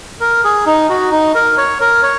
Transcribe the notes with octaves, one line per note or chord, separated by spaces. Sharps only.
A#4
G#4
D#4
F#4
D#4
A#4
C#5
A#4
C#5